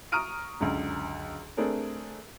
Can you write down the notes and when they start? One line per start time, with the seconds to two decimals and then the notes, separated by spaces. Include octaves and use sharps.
0.12 A#5 C#6 D#6 F6 D7 D#7
0.60 C#2 F#2 D3
1.57 A3 C4 D4 G#4 A#4